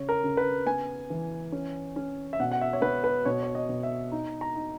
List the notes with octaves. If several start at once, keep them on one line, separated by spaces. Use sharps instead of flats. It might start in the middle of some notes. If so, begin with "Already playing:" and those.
Already playing: C#3 C#5
A#4
C#3
B4
B3 G#5
E3
C#4
C#4
E5
B2 F#5
F#5
E5
C#5
B3 B4
B4
B2 C#5
C#5
D#5
B2
E5
D#4
A#5
D#4